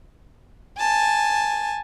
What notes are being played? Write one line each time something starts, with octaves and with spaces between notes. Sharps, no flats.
G#5 A5